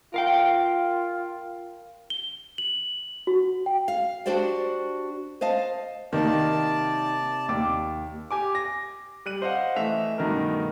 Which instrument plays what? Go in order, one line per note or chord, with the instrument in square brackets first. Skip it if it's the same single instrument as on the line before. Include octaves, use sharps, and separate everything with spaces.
[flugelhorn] F4 [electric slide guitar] A#4 F5 G5
[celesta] G7
F#7
F#4
G5
[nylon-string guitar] F5
D4 F#4 G4 C5 D5 G5
C5 D#5 F5 A5
[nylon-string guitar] C3 [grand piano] D#3 A#3 [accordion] D5 A5
[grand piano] D#2 D6
G4 G#5 D6
A#6
G3 F#6 D#7 F#7
C5 D#5 F5 F#5
E3 A3 D#5 E5 F7
G2 B2 D#3 A3 A#4